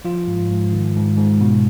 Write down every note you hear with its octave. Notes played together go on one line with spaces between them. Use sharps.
F3 F4
G#2
G#2
D#3
G#2
G#2
B2